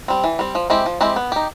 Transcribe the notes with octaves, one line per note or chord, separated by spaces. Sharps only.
G3 C4
E3
G3 C4
F3
G#3 C4 E4 G4
F3
G#3 C4 E4 G4
B3
D#4 G4